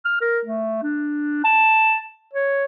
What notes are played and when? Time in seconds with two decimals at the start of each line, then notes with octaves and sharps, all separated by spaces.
0.05 F6
0.21 A#4
0.45 A3
0.83 D4
1.44 A5
2.33 C#5